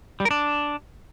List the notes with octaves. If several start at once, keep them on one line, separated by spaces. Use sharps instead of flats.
G3
A#4
D4